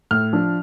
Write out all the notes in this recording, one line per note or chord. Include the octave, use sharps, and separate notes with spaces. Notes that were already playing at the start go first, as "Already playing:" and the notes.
A2 F6
F3 D4